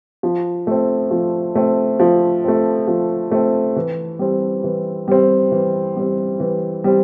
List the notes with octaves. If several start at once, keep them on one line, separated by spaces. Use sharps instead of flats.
F3
A3 C4
F3
A3 C4
F3
A3 C4
F3
A3 C4
E3
G3 C4
E3
G3 C4
E3
G3 C4
E3
G3 C4